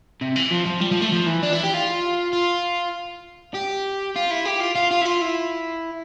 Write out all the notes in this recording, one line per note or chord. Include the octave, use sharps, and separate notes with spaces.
C3
E3
F3
F3
G3
F3
A3
F3
E3
D4
E4
G4
F4
F4
G4
F4
E4
G4
F4
F4
F4
E4
F4
E4